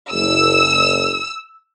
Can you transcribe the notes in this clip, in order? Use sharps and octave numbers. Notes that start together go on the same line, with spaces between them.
F#1 E6